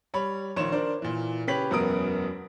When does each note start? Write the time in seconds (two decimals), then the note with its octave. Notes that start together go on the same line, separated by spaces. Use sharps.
0.14 G3 C#5 B5
0.57 A#1 D#3 C#5 C6 E7
0.72 D4 A#4 C5 D5
1.02 A#2 E3
1.47 C#3 G4 B4 C#5 B6 F#7
1.71 E1 F#2 B3 A#4 D#6 D7